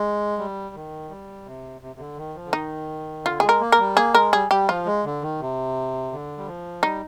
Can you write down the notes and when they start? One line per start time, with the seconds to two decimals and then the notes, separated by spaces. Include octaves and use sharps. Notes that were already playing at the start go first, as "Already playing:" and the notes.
Already playing: G#3
0.38 G3
0.75 D#3
1.10 G3
1.46 C3
1.81 C3
1.96 C3
1.99 D3
2.17 D#3
2.35 F3
2.45 D3
2.53 D#3 D#4
3.25 D3 F4
3.40 G#3 G#4
3.49 A#4
3.60 A#3
3.72 A#4
3.79 G3
3.97 A#3 G#4
4.14 G#3 A#4
4.33 G3 G#4
4.51 G3 G4
4.69 F3 F4
4.86 G#3
5.04 D3
5.22 D#3
5.40 C3
6.12 D3
6.38 G3
6.47 F3
6.83 G3 D#4